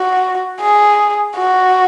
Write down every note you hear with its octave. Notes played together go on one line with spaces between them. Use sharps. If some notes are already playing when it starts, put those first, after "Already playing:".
Already playing: F#4
G#4
F#4